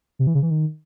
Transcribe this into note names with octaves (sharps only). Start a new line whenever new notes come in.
C3
E3
C#3
E3
D#3